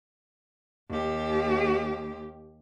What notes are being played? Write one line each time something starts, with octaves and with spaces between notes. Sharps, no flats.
D#2 G4